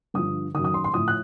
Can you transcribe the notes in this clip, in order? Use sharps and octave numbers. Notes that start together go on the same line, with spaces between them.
G2 D3 F3 D#6
F#2 D#3 D#6
D#6
C6
C6
A2 F3 D#6
F#6